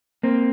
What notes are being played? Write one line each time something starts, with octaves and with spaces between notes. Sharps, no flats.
A#3 C4